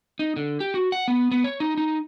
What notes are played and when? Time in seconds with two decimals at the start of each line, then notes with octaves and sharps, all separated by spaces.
0.19 D#4
0.36 D3
0.60 G4
0.74 F#4
0.92 F#5
1.08 B3
1.31 B3
1.44 C#5
1.60 D#4
1.77 D#4